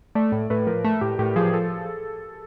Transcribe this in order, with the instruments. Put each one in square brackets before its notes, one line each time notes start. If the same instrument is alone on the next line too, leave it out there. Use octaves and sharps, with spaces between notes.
[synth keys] A3 [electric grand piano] D5
[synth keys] A2
[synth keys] A2 [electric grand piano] B4
[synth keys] F3 [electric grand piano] A#4
[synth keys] A3
[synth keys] A2 [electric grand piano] G4
[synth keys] A2 [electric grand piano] G4
[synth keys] F3 [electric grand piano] G#4
[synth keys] F3 [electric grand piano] A4